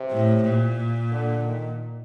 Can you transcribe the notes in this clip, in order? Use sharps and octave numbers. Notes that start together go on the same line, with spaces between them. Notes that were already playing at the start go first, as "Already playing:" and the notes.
Already playing: C3
A2
A#2
D3
D#3